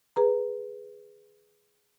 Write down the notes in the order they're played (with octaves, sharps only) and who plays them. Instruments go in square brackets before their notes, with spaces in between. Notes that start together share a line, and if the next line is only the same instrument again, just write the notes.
[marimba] G#4 B4 A#5